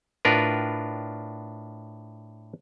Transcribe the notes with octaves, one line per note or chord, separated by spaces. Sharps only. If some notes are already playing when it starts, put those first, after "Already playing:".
A2 D4 F4 A#4 B4